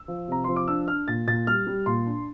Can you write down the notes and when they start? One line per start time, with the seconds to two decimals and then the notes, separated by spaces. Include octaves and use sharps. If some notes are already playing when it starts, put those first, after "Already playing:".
Already playing: E6
0.08 F3
0.28 C3 A#5
0.44 F3 C6
0.56 D6
0.68 D4 E6
0.88 D4 F6
1.08 A#2 A6
1.27 A#2 A6
1.47 G3 F6
1.67 G3
1.86 A#2 C6
2.06 D4